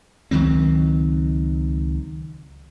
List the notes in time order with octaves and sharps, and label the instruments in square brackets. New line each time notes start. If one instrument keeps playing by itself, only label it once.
[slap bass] C#2 D#3 F#3 C4